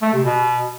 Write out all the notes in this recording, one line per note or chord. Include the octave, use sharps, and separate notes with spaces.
A3
C3
B2